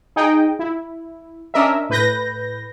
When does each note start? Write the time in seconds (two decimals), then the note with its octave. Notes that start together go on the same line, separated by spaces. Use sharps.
0.16 D#4 G#4 D#5 G5
0.59 E4
1.54 C#4 D4 A#4 D#5 E5
1.89 A2 B4 G6 A#6